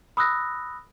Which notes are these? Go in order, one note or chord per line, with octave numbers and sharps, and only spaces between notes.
B5 D#6 E6 F#6 A#6